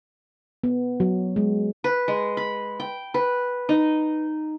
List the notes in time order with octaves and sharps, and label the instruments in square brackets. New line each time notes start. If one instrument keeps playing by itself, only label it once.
[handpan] B3
F#3
G#3
[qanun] B4
G#3
B5
G5
B4
D#4